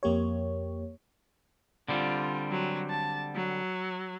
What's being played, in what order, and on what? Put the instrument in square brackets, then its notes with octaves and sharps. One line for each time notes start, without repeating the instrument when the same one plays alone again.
[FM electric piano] F2 A#3 G4 C#5
[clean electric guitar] D3 G3 C4 [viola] F4
[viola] F#3
A5
F#3